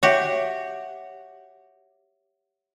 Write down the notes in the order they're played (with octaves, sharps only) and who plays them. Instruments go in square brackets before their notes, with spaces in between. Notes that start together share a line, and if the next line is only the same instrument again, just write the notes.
[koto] F#4 G4 [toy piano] C#5 E5 F#5